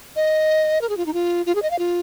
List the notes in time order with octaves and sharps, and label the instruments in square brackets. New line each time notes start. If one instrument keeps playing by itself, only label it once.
[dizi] D#5
A#4
G#4
F4
D#4
F4
F4
G#4
D#5
F5
F4